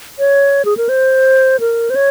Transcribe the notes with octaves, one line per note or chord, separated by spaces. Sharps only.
C#5
G#4
A#4
C5
A#4
C5
C#5